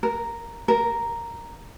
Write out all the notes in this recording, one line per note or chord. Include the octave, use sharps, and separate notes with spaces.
A#4
A#4